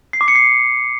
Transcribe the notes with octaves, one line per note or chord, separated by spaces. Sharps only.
C7
D6
C#7
C7